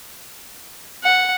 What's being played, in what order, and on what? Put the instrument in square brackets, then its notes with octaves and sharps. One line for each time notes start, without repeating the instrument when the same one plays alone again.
[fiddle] F#5